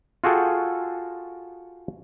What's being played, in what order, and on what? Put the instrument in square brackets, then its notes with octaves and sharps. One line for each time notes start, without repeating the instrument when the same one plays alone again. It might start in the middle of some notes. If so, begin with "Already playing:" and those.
[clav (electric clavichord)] F4 F#4 G#4 A4 G5